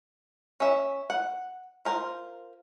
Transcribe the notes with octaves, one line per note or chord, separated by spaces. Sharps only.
C#4 E5
F#5
F4 A#4 C5